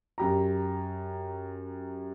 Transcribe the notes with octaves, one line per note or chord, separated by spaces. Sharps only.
F#2 G4 A#5